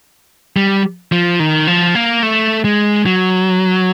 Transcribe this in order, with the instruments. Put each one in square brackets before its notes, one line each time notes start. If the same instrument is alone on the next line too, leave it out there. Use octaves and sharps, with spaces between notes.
[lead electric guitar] G3
F3
D#3
F3
A#3
A3
G#3
F#3